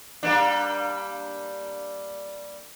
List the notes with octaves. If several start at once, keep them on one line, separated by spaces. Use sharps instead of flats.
G3 A#3 D4